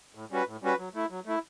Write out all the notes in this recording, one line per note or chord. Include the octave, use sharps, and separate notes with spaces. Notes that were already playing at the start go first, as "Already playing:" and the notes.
A2
G3 C#4 F#4 B4
A2
G3 C#4 F#4 B4
F#3
A3 E4
F#3
A3 E4